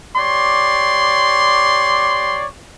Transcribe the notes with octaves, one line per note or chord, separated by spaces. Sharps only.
G4 C#5 D5 C6